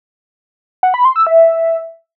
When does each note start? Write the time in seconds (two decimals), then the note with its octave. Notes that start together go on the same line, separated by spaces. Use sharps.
0.83 F#5
0.94 B5
1.05 C6
1.16 E6
1.27 E5